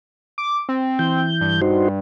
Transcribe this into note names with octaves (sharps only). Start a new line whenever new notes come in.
D6
C4
E3 G6
G2
D#4 F#4 C5